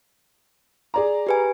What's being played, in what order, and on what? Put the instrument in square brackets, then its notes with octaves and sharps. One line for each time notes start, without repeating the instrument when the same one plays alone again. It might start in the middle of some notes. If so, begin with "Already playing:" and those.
[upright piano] G#4 D5 A#5
[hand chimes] G4 B4 G#5